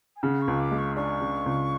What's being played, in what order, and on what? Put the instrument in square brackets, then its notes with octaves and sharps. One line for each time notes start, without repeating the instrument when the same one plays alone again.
[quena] G#5
[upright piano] C#3 [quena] F#5
[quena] C#6
[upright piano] C#2
[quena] D6
[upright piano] G#3
[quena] C#6
[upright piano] D4 [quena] C#6
[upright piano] C#3
C#2